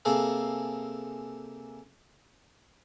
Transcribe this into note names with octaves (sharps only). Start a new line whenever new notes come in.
C3 A#3 G#4 A4 F5